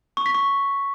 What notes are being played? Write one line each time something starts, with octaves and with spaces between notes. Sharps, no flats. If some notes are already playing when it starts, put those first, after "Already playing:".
C#6
B6
C#6